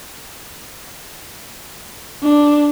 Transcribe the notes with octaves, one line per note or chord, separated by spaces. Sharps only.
D4